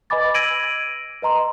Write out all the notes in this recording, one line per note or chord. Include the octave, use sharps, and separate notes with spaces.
B4 D#5 G#5 B5 D6 A6
E6 G#6 A#6 D7 D#7 F#7
B4 D#5 A#5 C6